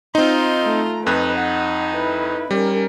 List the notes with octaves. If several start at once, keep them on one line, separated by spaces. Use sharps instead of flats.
C4 D#4 F4 C6
A3 A#5
F2 D#4 B4 F#6
F#5
E4 B4
G3 C#4 A#4